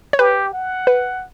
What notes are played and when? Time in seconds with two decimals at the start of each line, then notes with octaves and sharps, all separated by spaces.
0.13 C#5
0.19 G4 B4
0.53 F#5
0.87 B4